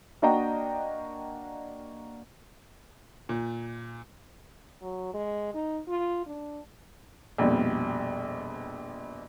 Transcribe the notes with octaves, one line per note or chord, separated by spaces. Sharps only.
A#3 D4 F#4 D#5 G5 A#5
A#2
F#3
G#3
D#4
F4
D4
A#1 F2 B2 G3